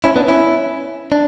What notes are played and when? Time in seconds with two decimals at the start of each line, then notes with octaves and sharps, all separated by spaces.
0.04 C#4 E4
0.16 B3 D4
0.28 C#4 E4
1.12 D4